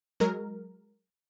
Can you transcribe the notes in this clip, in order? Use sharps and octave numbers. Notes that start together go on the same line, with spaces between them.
F#3 G#3 A#4